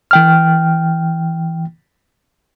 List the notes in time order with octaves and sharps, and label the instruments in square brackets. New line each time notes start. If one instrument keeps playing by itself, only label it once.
[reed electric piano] E3 G5 F6